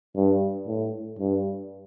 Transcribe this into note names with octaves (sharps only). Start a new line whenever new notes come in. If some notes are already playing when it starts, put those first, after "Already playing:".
G2
A2
G2